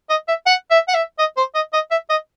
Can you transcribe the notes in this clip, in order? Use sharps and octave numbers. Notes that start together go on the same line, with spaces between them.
D#5
E5
F#5
E5
F#5
E5
D#5
C5
D#5
D#5
E5
D#5